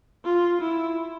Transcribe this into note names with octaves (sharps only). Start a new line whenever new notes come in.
F4
E4